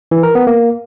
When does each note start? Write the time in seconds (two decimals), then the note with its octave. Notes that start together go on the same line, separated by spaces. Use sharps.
0.11 E3
0.23 A#4
0.35 B3
0.47 A#3